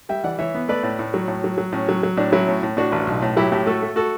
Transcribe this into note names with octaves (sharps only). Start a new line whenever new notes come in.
G3 E5 G5
E3 D5 F#5
E3 C#5 E5
B3
A3 B4 D5
A2
A2
F#3
A2
F#3
F#3
A2 C#4
F#3
F#3
A2 D4
F#3 C#4 E4
A2
A2
A2 D4 F#4
A1
B1
A2
F#3 E4 G4
A2 E4 G4
A3 F#4 A4
A3
F#4 A4